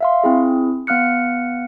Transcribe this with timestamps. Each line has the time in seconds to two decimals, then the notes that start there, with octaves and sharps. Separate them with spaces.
0.01 E5 F5 C6
0.24 C4 E4 G#4
0.87 B3 F5 F6 F#6 C#7